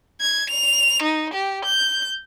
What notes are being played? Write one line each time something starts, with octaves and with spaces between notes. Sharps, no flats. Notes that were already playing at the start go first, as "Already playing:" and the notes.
G#6
F7
D#4
G4
G6